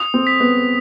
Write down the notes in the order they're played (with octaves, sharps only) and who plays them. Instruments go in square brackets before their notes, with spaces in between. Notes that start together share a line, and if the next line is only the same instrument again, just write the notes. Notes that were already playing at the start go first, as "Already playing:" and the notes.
Already playing: [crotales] D#6
[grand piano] C4
[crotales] B6
[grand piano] B3